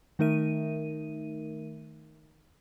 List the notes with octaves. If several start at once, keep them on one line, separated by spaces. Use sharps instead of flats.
D#3 A3 D#4 A#4 E5 D#7